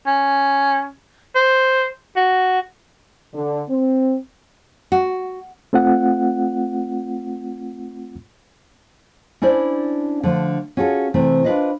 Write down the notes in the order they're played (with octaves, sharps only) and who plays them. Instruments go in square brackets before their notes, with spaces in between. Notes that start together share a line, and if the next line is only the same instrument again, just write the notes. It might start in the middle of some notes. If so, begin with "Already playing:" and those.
[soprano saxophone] C#4
C5
F#4
[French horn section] D3
C4
[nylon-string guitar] F#4
[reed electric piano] A3 C4 F4 F#5
[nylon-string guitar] C#4 D4 E4 C5 D5
D3 F3 A3
C#4 F4 F#4 G#4 A4
C3 E3 A3 C4
D4 F4 G#4 B4 C5 D#5